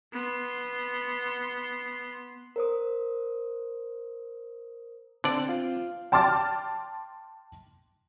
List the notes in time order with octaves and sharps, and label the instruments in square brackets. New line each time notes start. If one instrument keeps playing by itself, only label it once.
[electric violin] B3 C6
[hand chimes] A#4 C5 D#6
[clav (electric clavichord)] D3 D5 [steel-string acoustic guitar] C4
[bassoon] F4
[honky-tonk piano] G5 A5 C6 D6 F6 A6